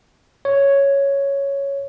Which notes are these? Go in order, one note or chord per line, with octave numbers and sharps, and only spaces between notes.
C#5